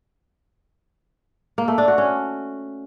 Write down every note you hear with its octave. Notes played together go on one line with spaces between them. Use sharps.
A#3
A3
D4
F#4
C#4